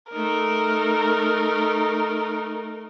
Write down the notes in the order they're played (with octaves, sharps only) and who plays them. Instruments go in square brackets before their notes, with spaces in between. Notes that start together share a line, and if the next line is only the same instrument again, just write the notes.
[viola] A3 D#4 [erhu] A#4